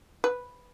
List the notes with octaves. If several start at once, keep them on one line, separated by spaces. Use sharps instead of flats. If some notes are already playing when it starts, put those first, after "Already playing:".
B4